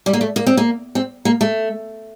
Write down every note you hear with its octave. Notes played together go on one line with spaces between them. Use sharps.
G3
A#3
A3
A#3
C4
A#3
C4
A#3
A3